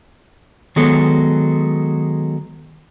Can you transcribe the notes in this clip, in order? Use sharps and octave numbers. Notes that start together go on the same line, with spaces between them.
D#3 F#3 G#3 B3 A4